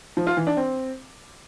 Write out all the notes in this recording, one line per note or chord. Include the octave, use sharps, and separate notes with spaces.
F3
F4
E3
D4
C4